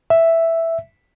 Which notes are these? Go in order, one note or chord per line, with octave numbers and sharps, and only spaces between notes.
E5